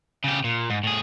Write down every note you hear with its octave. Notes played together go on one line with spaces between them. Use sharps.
C#3 G4
A#2
G#2
A2 G#4